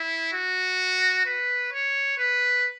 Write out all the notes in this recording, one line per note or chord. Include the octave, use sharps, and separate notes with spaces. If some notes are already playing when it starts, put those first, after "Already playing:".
Already playing: E4
F#4
B4
C#5
B4